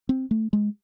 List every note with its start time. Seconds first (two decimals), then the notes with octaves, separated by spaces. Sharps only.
0.09 C4
0.31 A3
0.53 G#3